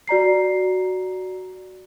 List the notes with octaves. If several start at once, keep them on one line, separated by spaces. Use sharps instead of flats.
F#4 D5 A#5 C7